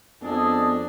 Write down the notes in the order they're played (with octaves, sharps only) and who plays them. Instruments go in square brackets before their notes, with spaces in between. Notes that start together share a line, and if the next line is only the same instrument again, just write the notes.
[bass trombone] F2 [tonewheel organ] B3 [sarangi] D4 [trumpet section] G#4 A4 D#5